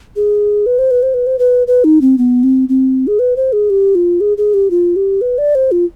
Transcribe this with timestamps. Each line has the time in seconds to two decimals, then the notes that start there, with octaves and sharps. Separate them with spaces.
0.16 G#4
0.66 B4
0.79 C5
0.91 B4
1.03 C5
1.14 B4
1.27 C5
1.39 B4
1.67 B4
1.84 D#4
2.01 C4
2.18 B3
2.43 C4
2.69 C4
3.07 G#4
3.19 B4
3.36 C5
3.53 G#4
3.70 G4
3.95 F4
4.21 G#4
4.38 G#4
4.54 G4
4.70 F4
4.96 G4
5.21 B4
5.38 D5
5.55 C5
5.72 F4